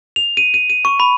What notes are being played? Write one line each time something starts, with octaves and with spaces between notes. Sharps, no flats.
F7
D#7
D#7
D#7
C#6
B5